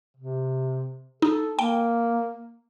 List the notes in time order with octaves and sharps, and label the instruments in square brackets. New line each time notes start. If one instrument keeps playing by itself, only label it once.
[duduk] C3
[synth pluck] D#4 [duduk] A4
[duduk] A#3 [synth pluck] G5